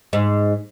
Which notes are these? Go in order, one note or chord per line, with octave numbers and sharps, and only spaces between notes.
G#2